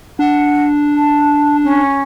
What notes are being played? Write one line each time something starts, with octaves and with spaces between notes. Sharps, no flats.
D4 F#5
A5
C#4